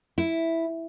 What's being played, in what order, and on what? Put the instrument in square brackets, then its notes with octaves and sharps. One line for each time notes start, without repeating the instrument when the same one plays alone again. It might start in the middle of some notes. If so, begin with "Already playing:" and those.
[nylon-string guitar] E4